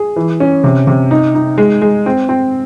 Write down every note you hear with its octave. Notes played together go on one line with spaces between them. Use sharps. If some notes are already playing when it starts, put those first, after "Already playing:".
Already playing: G#4
E3
C#4
C3
C3
D#4
D#4
G#3
G#3
C4
C4